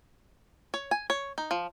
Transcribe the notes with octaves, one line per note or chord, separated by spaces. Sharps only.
C#5
G#5
C#5
D#4
F3